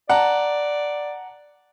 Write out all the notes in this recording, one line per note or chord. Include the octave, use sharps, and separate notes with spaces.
D5 F#5 A5 A#5